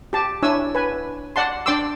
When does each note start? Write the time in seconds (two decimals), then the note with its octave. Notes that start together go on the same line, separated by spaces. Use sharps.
0.13 G4 A5
0.42 D4 E4 C#5 G#5 E6
0.75 B4 G#5
1.36 D5 F#5 A5 C6
1.66 D4 D5 G5 C6 D6 E6